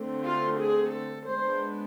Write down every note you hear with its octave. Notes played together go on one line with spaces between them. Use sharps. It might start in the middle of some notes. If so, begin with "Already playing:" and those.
Already playing: D3 A3 C4
F4
G#4
A4
G#3 B3 D4 C5